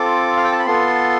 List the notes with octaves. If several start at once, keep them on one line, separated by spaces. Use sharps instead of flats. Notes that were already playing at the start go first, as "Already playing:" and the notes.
Already playing: C4 F4 A4 D6
F5
G5
A5
B5
B3 F4 A4 C6